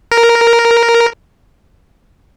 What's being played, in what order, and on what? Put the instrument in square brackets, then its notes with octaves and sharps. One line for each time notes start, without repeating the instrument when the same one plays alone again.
[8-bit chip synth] A#4